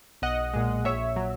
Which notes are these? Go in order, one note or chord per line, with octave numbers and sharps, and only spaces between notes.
B1 D#5 F#5
A#2 G#3
A#1 C#5 E5
F#3